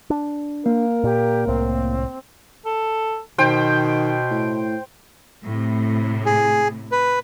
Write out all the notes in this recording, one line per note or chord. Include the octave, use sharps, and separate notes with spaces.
D4
A#3 A#4
A#2 G4
C2 A2 C4
A4
B2 D#3 C5 G5
A2
A2 C3
G#4
B4